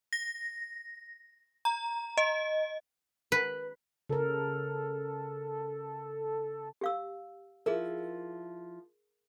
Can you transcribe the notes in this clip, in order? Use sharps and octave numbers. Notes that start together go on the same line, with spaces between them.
A#6
A#5
D#5
B4
C#3 A4 A#4
G4 F5 E6
F3 E4 G#4 A#4 E5